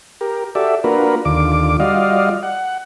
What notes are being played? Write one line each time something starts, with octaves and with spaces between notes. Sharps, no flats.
G4 A#4
F#4 G4 A4 D5 E5
A#3 D4 F4 F#4 A#4 B4
D#2 D3 F4 D6
G3 F4 F#4 D5 D#5 F5
F#5